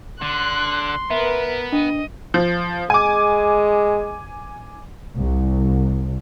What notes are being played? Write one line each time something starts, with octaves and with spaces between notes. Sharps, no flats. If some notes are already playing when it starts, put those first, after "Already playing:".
D3 C6 F#6
B3 A#4 B4 E5
D4 D#5
F3
G#3 G#5 D6
C2